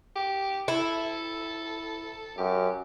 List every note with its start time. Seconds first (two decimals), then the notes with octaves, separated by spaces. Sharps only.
0.16 G4
0.68 E4 A4
2.37 F#2 G4